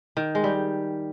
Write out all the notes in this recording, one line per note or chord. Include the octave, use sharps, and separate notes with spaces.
D#3
G#3
G3